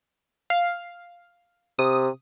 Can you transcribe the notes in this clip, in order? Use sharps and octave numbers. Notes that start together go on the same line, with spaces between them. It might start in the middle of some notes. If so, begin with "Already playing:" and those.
F5
C3 D#6